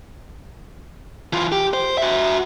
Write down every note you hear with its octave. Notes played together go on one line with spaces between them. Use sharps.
E3 F4
G4
C5
F#4 E5